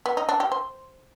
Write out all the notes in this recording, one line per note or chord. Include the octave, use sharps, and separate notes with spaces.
B3
D#4
D4
G4
C5